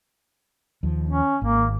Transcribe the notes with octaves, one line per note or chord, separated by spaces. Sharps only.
D#2 F3
C#4
G#1 A#3